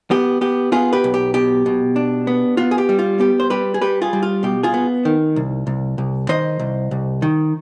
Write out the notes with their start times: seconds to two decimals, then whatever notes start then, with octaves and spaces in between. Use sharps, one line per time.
0.11 B3 G4
0.41 B3 G4
0.72 B3 F4 G#4
0.93 G4 B4
1.04 B1
1.14 G4
1.34 B2 G4
1.66 B2
1.96 D4
2.27 B3
2.57 B3 F4
2.71 G#4
2.78 G4
2.89 G3
2.99 F4
3.20 B3 G4
3.40 C5
3.50 G3 G4 B4
3.74 G#4
3.81 G3 G4 B4
4.02 F4 G#4
4.13 G3
4.23 F4
4.43 B2 G4
4.63 F4 G#4
4.74 B3
5.05 D#3
5.36 C2
5.67 C2
5.98 C2
6.29 D#3 C5 D#5
6.60 C2
6.91 C2
7.22 D#3